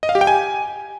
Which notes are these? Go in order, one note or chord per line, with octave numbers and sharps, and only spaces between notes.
D#5
F5
G4
G5
G#5